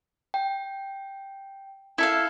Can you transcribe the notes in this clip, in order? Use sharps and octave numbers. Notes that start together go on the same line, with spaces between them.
G5
E4 A4 F5